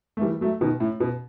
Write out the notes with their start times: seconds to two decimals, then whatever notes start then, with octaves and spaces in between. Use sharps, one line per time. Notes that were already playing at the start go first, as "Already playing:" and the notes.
0.17 A3
0.21 E3 G3
0.41 F#3 A3
0.61 B2 D#3
0.80 A2
1.00 B2